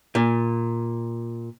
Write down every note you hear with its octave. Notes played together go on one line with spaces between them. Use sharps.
A#2